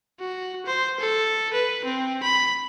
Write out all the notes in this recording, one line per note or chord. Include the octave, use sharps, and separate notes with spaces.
F#4
C5
A4
B4
C4
B5